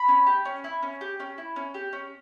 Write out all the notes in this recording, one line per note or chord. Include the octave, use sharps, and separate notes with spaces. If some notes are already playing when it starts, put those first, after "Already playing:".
Already playing: B5
C#4
G4
C#4
E4
C#4
G4
C#4
E4
C#4
G4
C#4